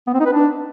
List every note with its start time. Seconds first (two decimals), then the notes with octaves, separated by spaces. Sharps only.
0.07 B3
0.13 C4
0.20 D#4
0.26 B4
0.32 D4